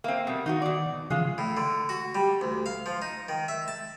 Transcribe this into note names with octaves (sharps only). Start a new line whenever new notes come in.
A#3 C4 E5
B2 G3
D#3 D#4 F4 F#4
B2 D5
C#3 E3 F3 G#3 F4
A2
D3
F#4
G3
D2
F5
F3
D#4
D#3
E5
A5